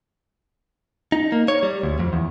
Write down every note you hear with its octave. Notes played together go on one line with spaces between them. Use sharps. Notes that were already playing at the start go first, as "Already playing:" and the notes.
D#4
A#3
C#5
G3
D2
F2
E2